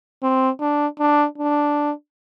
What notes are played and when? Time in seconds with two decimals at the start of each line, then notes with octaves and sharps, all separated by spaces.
0.23 C4
0.60 D4
1.00 D4
1.38 D4